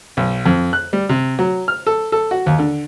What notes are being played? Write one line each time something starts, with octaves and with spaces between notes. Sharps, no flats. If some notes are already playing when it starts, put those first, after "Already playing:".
B1
F2
F#6
G3
C3
F#3
F6
A4
A4
F#4
D#2
D3